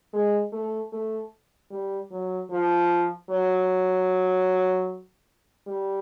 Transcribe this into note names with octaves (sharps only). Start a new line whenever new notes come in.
G#3
A3
A3
G3
F#3
F3
F#3
G3